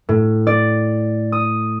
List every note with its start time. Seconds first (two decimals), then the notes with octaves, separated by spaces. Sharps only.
0.09 A2
0.47 D5
1.32 D#6